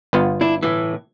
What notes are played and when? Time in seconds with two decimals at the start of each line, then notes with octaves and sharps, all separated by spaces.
0.13 G1 B3 F4
0.41 D4 E4
0.63 A2 E3